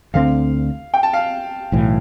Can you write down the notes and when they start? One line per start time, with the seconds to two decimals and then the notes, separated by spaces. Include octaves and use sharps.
0.14 D2 D3 G3 C4 F5
0.94 G5
1.03 A5
1.13 F5
1.72 B1 A2 E3